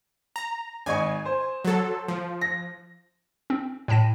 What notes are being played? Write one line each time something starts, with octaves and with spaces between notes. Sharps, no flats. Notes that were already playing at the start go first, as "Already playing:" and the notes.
A#5
G#1 D#5 G#5 C#6
C5
F#3 A4
F3
A#6
C4
A2 G5 A5 A#6 D#7